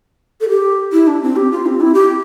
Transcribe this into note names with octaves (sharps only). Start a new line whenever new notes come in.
A4
G4
E4
D4
C4
G4
F4
C4
E4
G4